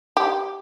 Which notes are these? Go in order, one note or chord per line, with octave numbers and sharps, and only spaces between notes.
G4